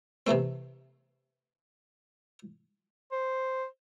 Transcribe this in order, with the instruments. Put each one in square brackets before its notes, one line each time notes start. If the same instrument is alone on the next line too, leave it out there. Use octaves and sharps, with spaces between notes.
[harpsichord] C3 E3 A3 C4
[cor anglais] C5